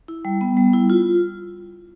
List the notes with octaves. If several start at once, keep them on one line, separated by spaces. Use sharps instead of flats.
E4
G3
B3
G3
E4
F4